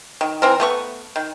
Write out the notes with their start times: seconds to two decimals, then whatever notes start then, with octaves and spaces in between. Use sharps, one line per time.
0.21 D#3
0.42 E3 C4 A#4
0.60 A3 B3 C#6
1.16 D#3